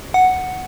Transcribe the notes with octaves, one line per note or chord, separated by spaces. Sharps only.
F#5